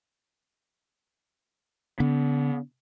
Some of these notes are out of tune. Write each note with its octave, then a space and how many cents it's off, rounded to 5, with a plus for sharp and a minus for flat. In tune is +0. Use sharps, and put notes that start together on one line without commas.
D3 -40 B3 +5